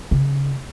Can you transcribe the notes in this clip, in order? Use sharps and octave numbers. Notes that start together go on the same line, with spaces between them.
C#3